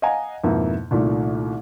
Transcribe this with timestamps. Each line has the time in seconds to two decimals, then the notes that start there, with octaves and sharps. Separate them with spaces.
0.02 D#5 F5 F#5 G#5 A#5
0.44 F2 G#2 B2 A#3 E4
0.91 C2 A#2 D#3 A3